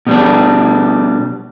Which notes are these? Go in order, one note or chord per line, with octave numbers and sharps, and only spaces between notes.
B2 G3 D4